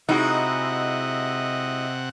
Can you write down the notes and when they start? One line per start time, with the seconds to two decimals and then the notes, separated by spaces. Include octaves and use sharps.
0.09 C3 G#3 D#4 E4 F#4 D#5 E5 F#5